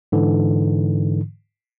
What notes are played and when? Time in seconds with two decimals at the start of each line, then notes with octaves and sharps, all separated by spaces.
0.12 G#2 D3 E3